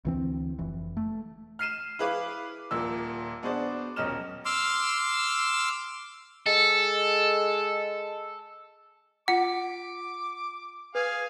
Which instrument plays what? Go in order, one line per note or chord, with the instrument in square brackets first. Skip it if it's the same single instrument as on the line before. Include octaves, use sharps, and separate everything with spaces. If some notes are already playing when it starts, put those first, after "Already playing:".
[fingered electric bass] D2 E3 C4
F1 E3
A3
[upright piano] F6 C7 D#7 E7
E4 G#4 B4 F5 D6
D#1 A#2 E6
B3 D4 F#4 G#4 C5 D5
D#1 B1 C#4 D#5 F6 E7
[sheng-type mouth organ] C6 D6 E6 F6
[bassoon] G#3 [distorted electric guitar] A4
[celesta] F4 C#7 [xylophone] F#5 [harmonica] D6
[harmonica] G#4 F5 G#5 [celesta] B4